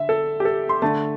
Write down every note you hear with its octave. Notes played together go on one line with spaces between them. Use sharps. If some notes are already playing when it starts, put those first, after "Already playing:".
Already playing: D3 E5
A4
G4
A4
C6
D3 A3 A5